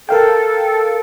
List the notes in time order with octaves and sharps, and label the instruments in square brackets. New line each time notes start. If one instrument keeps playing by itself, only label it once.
[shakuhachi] A4 [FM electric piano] A#4 F5 G5